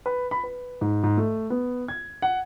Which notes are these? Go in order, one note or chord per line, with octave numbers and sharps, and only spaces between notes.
B4
B5
B4
G#2
G#2
A3
B3
G#6
F#5